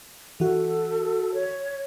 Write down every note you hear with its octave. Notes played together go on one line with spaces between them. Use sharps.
E3 F#4 A4
C#5